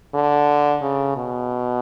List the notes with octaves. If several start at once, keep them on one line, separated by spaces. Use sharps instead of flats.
D3
C#3
B2